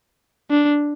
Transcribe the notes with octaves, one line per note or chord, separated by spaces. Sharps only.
D4